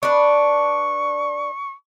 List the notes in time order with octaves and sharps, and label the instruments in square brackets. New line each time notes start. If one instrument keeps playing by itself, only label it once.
[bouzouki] D4 B4 [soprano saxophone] C#6